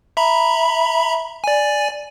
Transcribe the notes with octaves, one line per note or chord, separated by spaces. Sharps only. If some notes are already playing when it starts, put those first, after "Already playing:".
E5 A#5 B5
D5 G#5